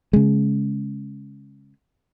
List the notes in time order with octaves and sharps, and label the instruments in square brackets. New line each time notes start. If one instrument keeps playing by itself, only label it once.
[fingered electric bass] C#3 G#3